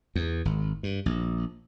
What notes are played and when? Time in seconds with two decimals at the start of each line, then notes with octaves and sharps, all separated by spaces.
0.16 E2
0.45 G#1
0.83 G2
1.06 A#1